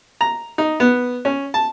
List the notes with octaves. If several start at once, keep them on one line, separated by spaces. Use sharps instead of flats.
A#5
D#4
B3
C#4
A5